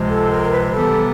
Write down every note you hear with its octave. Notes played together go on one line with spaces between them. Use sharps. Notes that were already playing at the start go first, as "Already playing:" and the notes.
Already playing: C#2 C3 F3 G#3
A4
A#4
B4
C3 E3 G3 B3 A4